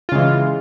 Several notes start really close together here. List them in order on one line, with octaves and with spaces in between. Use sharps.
F4 C#3 G#3 E3